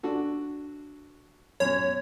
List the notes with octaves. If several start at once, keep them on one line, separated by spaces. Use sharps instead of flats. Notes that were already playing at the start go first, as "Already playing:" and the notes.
D4 F#4 A4
F#2 B2 C#5